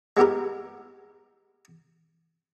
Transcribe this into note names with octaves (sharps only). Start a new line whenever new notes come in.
G#3 B3 E4 G4 A#4